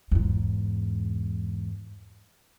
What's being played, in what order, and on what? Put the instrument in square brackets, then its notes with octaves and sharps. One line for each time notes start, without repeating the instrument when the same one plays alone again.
[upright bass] E2 G#2